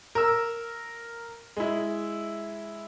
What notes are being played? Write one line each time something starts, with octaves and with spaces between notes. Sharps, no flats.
A#4 E6
G#3 E4